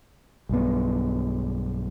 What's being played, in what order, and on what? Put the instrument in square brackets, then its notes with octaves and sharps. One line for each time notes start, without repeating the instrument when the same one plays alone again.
[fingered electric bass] B1 G2 B3